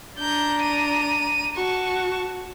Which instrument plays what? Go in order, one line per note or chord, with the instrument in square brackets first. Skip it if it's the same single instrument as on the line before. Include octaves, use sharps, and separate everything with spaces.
[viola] D4 A#5 [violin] G6
[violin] D#7
[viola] F#4 [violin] A5 C#6